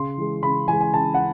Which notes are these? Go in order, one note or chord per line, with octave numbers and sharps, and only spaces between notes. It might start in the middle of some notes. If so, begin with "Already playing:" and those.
Already playing: C#3 C6
E3 G#3
C#3 B5
E3 G#3 G#5
G#5
C#3 A5
F#5